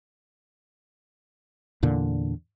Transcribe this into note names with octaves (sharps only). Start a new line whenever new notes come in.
E2 A#2 D3